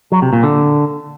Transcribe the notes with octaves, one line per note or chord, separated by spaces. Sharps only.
F#3
C3
A#2
D3